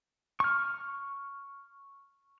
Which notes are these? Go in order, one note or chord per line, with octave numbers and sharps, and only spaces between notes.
C#6 F6